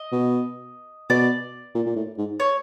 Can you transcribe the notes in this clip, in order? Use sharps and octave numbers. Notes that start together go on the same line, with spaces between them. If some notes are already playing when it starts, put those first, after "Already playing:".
Already playing: D#5
B2
B2 D5
A#2
A#2
A2
G#2
C#5